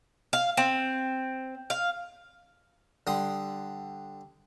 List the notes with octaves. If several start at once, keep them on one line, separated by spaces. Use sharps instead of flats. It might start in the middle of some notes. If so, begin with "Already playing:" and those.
F5
C4
F5
D3 G3 C6 D#6